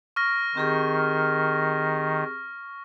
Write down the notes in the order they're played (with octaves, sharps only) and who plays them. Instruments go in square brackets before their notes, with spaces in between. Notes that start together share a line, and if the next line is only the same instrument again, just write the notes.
[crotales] C#6 F6 A#6
[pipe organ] D#3 [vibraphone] C4 G4 G#4